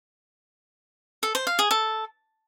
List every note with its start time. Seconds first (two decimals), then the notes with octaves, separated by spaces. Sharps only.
1.23 A4
1.35 C5
1.47 F5
1.59 G#4
1.71 A4